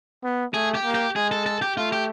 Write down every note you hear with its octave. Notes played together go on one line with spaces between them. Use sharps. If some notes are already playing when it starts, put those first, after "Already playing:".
B3
A3 G#4
G4
A#3
G4
G#3 G#4
A4
A4
G4
A3 F4
G4